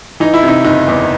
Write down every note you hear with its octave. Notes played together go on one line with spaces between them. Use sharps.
E3 D#4
E4
C3
D#4
F#1 D#4
E2